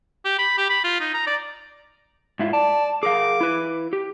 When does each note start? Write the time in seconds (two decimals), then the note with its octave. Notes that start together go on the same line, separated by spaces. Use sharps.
0.25 G4
0.39 B5
0.58 G4
0.70 B5
0.84 F4
1.00 D#4
1.14 A#5
1.27 D5
2.39 G#2 E4 F4
2.53 D5 A5
3.03 G#4 A#4 F5 D6
3.41 E4 B4
3.93 G4